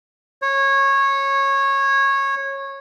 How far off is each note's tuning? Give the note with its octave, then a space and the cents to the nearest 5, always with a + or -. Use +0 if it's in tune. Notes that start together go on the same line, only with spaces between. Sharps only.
C#5 -15